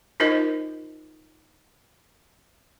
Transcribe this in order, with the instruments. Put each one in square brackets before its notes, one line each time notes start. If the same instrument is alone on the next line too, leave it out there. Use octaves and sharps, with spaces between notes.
[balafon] D#4 F4 A#4 C5 D#5